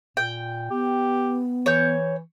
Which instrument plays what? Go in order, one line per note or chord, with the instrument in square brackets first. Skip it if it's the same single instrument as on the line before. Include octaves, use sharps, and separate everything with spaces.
[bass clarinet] A#2 [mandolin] G5
[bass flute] B3 [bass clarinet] G4
[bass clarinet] E3 [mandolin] C#5 G6